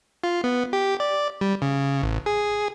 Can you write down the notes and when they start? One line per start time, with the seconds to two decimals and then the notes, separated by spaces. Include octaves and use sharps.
0.24 F4
0.44 B3
0.73 G4
1.00 D5
1.41 G3
1.62 C#3
2.02 A1
2.26 G#4